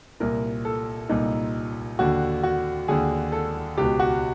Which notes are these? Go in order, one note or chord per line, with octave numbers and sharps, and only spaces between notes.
C2 A#2 A#4
A4
C2 A#2 D#4
D#2 D3 F#4
F#4
D#2 D3 G#4
A4
C#2 B2 G4
F#4